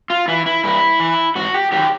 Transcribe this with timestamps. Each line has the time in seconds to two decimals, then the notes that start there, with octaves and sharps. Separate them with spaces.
0.10 F4
0.28 E3 E4
0.46 E4
0.64 G2 E4
1.00 E3
1.35 G#2 F#4
1.54 G4
1.72 D#3 F#3 G4